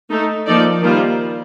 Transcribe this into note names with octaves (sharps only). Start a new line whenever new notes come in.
A3 D#4 A4
F3 A#3 D#4 A4 D5
D#3 G3 A#3 F4 C5